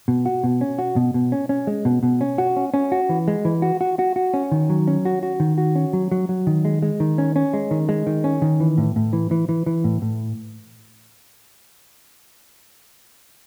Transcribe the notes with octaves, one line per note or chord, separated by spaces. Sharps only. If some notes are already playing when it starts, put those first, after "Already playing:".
B2
F#4
B2
C#4
F#4
B2
B2
C#4
C#4
G#3
B2
B2
C#4
F#4
C#4
C#4
F#4
E3
G#3
E3
F#4
F#4
F#4
F#4
C#4
D#3
F#3
C#4
F#4
F#4
D#3
F#4
C#4
F#3
F#3
F#3
D#3
G#3
G#3
D#3
C#4
C#4
G#3
D#3
G#3
D#3
C#4
D#3
E3
A2
A2
E3
E3
E3
E3
A2
A2